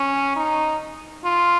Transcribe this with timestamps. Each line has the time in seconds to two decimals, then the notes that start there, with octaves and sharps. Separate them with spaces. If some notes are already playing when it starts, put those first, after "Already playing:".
Already playing: C#4
0.36 D#4
1.24 F4